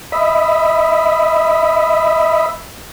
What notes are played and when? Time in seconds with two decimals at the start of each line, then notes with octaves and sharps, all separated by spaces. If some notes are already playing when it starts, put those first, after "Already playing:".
0.12 D#5 E5 B5